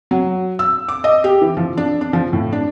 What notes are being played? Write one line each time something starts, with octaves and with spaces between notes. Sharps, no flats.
F#3
E6
D6
D#5
G4
E3
F3
D4
D4
F3
A2
D4